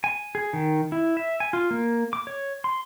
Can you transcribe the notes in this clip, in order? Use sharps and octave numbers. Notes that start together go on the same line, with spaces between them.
G#5
G#4
D#3
E4
E5
G#5
F4
A#3
D6
C#5
C6